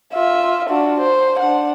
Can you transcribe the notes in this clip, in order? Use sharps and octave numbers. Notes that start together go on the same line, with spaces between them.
F4 E5
D4 F#4
C5
D4 F#5